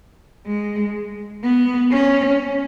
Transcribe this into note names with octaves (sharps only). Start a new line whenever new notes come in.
G#3
B3
C#4